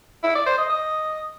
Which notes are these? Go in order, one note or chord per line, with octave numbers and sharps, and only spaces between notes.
E4
D5
C5
D#5
D#5